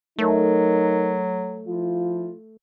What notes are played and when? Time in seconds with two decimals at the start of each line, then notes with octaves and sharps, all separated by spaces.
0.18 F#3 A3 D#4 A#4
1.67 F3 E4 F4